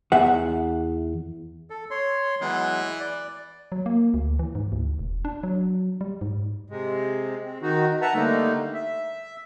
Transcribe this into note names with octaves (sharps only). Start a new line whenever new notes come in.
E2 E5 F#5
A4
C#5 C6
E3 F#3 G#3 B3
D5
F#3
A#3
D2
E3
G#2
D2
E1
D4
F#3
G3
G#2
C3 G#3
C4
D#3 D#4 F#4
B4 E5 F#5 A5 A#5
D3 G3 A3 A#3 D#4
E5